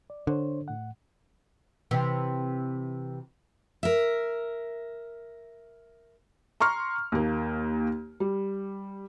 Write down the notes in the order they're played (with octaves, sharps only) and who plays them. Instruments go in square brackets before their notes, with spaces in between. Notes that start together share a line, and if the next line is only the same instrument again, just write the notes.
[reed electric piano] D5
[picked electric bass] D3 [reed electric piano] D4 C5 C#5
[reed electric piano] A2 F#5
[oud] C3 E3
[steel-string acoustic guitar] A#4 E5
[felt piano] A#5 C6 C#6 F6
D#2 A#3
G3